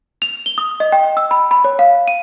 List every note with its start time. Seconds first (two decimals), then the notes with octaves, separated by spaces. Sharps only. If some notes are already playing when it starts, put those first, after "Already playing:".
0.22 F7
0.46 G7
0.58 D#6
0.80 D#5
0.92 G5
1.17 E6
1.31 B5
1.51 B5
1.64 C#5
1.79 F5
2.08 D#7